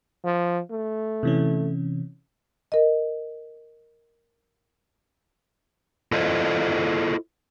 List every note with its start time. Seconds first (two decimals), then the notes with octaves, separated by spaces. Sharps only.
0.24 F3
0.70 A3
1.23 C3 E3 C#4
2.72 A#4 D#5
6.12 E4 F4 A4 C5 D5 D#5